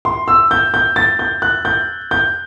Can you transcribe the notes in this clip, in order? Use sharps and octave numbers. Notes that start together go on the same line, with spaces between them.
C6
E6
G6
G6
A6
G6
F#6
G6
G6